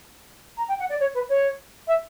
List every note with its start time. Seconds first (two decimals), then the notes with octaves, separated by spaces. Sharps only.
0.57 A#5
0.68 G5
0.79 F#5
0.89 D5
1.00 C#5
1.14 B4
1.29 C#5
1.87 E5